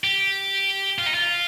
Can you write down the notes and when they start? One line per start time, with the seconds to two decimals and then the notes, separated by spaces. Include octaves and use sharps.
0.04 G4
0.98 F4
1.06 D#4
1.14 F4